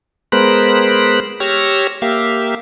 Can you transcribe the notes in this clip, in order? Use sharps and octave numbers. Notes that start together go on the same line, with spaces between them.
G#3 B3 A#4 C5 B5 F#6
G4 C#5 E6 F6 A#6
A#3 G4 E5 F5